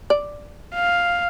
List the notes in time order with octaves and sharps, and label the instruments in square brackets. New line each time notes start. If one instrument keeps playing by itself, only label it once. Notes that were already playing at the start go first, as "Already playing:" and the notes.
[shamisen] D5
[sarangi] F5